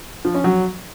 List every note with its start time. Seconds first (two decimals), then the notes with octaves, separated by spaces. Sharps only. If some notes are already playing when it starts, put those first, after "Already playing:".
0.25 F3
0.34 C#4
0.44 F#3